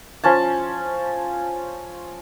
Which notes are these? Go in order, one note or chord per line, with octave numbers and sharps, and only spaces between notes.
F3 C#4 A5